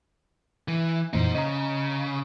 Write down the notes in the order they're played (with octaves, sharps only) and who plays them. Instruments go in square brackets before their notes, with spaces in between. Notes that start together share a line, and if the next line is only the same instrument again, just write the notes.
[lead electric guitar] E3
[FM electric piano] F2 A#2 E3 [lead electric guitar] D#4 C5
[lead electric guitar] C#3 [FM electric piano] D#5 A#5